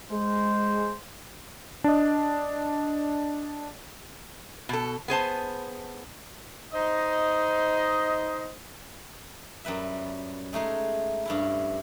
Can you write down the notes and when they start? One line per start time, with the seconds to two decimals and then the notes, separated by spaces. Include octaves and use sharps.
0.11 G#3 C5
1.84 D4 D#5
4.69 B2 A4
5.08 B3 G#4 C5 A5
6.73 D#4 C5 D#5
9.65 F#2 G3 B4 E5
10.53 G#3 A3 D#4 G#4
11.26 G2 C#4 E4